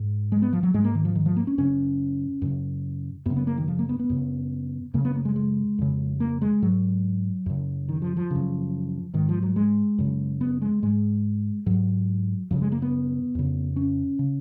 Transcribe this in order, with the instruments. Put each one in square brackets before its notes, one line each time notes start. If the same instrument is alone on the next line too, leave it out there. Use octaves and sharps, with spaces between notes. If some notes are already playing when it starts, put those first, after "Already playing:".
Already playing: [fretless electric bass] G#2
G#3
B3
F3
F#3
G#2 G#3
A#3
D#3
F3
D#3
F3
A#3
C#4
F#2 C#3 C#4
F#2 C#3
F#2 B3
C#3
B3
A#3
D#3
F3
A#3
B3
B3
F#2 C#3
F#2 C#3 A#3
B3
A#3
G#3
G#3
F2 C#3
A#3
G#3
G#2 F#3
F#2 C#3
D#3
F3
F3
F#2 C#3
G#2 D#3
F3
F#3
G#3
F#2 C#3
B3
G#3
G#2 G#3
G#2 F#3
F#2 C#3 F3
G#3
A#3
B3
F2 C#3
C#4
C#3